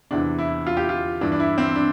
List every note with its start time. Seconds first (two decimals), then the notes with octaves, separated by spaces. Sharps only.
0.11 E2 C3 E3 D4
0.39 E4
0.67 F4
0.77 G4
0.89 F4
1.21 G2 E3 D4
1.32 D4
1.40 E4
1.58 C4
1.76 D4